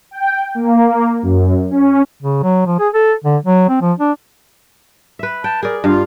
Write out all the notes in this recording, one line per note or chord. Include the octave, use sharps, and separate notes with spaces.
G5
A#3
F#2
C#4
C#3
F#3
F3
G#4
A4
D3
F#3
C4
F3
D4
B4 E5
G5 A5
G#4 A#4 D5
G2 F4 F5